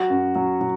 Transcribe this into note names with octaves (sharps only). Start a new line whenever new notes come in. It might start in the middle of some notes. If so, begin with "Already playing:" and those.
Already playing: F#3 F#4
F#2
F#3
F#3